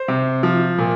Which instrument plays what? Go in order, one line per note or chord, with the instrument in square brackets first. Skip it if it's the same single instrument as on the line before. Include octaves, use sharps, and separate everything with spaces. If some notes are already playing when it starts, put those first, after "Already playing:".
Already playing: [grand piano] C5
C3
F3
A#2